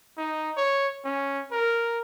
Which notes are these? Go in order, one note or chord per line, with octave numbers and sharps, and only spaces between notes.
D#4
C#5
C#4
A#4